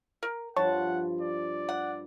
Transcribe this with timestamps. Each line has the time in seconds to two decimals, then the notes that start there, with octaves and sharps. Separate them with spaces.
0.23 A#4
0.56 G2 F3 C#5 F#5 A5
1.21 D5
1.69 F#5